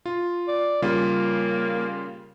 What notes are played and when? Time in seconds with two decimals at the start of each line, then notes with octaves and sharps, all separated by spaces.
0.06 F4
0.48 D5
0.82 C#3 G3 A#3 F4